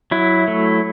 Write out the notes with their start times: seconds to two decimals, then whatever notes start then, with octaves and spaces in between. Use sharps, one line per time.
0.11 F#3 E4
0.48 A3